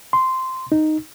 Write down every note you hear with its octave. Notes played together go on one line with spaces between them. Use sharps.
C6
D#4